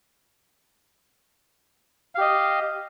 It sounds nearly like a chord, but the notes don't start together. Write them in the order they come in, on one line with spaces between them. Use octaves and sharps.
F5 G4 D#5